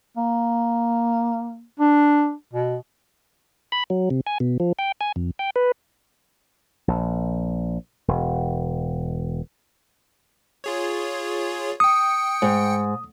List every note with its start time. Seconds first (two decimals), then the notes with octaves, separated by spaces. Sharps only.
0.17 A#3
1.80 D4
2.53 B2
3.72 B5
3.90 F#3
4.10 C3
4.27 G#5
4.40 B2
4.60 F3
4.79 G5
5.01 G#5
5.16 F2
5.39 G5
5.56 B4
6.88 A#1
8.08 E1
10.64 F4 G#4 C#5
11.80 G5 D#6 C#7
12.42 G#2